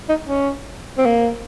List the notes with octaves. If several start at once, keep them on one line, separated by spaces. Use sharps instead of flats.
D#4
C#4
C4
A#3